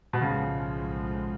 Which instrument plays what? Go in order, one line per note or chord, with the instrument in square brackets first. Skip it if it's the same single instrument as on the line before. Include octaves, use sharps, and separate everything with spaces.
[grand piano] B2
[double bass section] B1 A2 F3 G#3 [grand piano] C#3